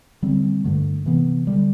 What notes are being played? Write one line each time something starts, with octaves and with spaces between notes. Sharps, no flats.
D3 G3 C4
G2 D3 A3
C3 E3 B3
D3 G3